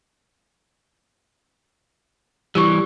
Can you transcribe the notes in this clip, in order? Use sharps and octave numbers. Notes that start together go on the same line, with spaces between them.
E3 G3 G4 C#6